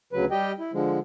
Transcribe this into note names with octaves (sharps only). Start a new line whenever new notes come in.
D2 C#3 F#3 B4
G3 G4 D#5 G5
E4
D3 F3 G#3